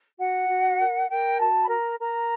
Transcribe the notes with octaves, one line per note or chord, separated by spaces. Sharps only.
F#4 F#5
F#4
A#4
A#4 G5
F#4 A5
B5
A#4 A#5
A#4 A#5